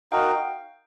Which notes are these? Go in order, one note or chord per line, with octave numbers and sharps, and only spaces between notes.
D#4 F#4 A#4 F5 G5